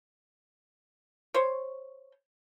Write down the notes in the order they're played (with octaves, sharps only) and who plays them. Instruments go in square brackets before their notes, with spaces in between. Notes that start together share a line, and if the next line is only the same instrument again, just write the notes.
[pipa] C5 C#5